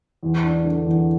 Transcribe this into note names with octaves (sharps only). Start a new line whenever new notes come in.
E2
D4
D3
E2